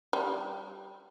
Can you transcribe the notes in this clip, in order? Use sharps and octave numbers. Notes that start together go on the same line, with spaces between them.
G3